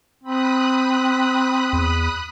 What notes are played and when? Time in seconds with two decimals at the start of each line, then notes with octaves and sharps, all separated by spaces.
0.23 C4 B5 D#6 F#6
1.73 E2